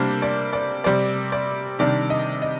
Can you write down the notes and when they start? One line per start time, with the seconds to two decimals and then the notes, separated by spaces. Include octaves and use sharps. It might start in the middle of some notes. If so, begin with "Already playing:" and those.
Already playing: C3 G3 A#3 D4 C5
0.22 D5
0.53 D5
0.84 C3 G3 C4 D5
1.32 D5
1.79 C3 D#3 G3 D4 D5
2.10 D#5
2.42 D#5